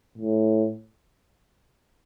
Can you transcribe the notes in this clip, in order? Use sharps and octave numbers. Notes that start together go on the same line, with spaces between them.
A2